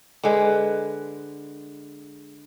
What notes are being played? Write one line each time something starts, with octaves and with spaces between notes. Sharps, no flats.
D3 G#3 B4